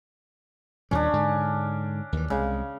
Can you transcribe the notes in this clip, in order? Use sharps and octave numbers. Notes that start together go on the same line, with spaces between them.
D#2 A#2 G3 C#4 D4
G#2 D3
D#2 E3
C2 C#3 G#3